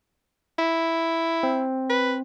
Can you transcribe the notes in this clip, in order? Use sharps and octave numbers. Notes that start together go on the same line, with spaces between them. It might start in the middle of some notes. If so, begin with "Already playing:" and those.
E4
C4
B4